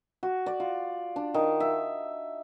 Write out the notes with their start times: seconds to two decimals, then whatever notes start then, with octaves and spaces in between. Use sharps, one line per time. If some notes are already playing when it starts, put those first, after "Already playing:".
0.23 F#4
0.46 D5
0.60 F4
1.16 D4
1.34 D#3
1.60 E5